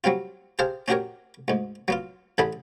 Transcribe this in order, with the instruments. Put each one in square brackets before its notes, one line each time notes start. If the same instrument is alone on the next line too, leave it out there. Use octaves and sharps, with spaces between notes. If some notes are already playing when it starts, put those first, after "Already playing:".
[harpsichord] F#3 G3 C4 F4
G4 G#4 C5 F5 A5
C#4 D4 F#4 G4 A#4 C#5
D2 G#2
F#3 B3 F4
A1 A2 D3 G#4 A5 B5